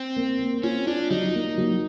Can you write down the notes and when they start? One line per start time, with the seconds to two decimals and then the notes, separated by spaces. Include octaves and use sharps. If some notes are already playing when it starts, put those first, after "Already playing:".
Already playing: C4
0.16 A#3
0.39 A#3
0.63 C#4 F4
0.87 D4 F4
1.11 F#3 D#4
1.35 A#3
1.58 F#3